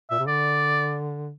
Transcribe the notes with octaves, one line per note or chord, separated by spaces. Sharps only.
A#2 E5
C3
D3 D5